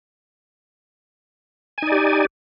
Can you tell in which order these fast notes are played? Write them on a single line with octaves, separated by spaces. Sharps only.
G#5 D#4 D5 G4